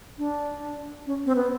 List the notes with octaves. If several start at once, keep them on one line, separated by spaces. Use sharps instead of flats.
D4
C#4
C4
B3